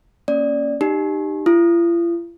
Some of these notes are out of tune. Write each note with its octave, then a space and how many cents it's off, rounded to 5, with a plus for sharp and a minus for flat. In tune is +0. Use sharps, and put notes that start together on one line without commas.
A#3 +0 C#4 +0 D5 +0
D#4 -25 G4 +0
F4 -45 D#6 -15